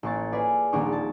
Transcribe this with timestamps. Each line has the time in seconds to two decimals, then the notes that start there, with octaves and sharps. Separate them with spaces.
0.03 A1 A#3 C#6 A6
0.32 F4 G#4 B4 D5
0.72 D#1 A#1 A#3 D4 C#6 D6
0.92 A5